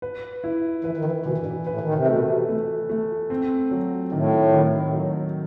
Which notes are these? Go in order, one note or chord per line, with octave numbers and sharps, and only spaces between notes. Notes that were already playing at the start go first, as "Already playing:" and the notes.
B4
E4
E3 B4
D#3
E3
B2 E3
G2
A2
A2 B4
D#3
C3
B2 A3
A3
A3
C4
F#3
A2 D#3
D#3
F#3